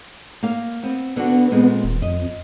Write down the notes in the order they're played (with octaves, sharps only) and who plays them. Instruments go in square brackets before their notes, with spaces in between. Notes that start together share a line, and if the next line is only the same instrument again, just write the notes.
[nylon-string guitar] A#3 F5
B3 C4
[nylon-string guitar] D3 D4 F#4 [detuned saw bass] B3
[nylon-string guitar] A#2 G#3 C4
[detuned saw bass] D#1
[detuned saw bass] F2 [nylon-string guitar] D#5